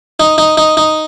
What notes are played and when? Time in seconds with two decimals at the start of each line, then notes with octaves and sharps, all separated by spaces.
0.20 D#4
0.38 D#4
0.57 D#4
0.77 D#4